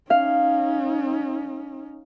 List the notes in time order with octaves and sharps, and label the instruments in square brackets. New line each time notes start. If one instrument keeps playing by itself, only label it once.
[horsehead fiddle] C#4 D#4 [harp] F5